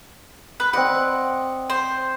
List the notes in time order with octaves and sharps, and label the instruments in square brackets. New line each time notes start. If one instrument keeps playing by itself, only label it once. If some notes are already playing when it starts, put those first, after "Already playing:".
[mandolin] B4
[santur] C4 D5 D#5 [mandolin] F#5
[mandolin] C5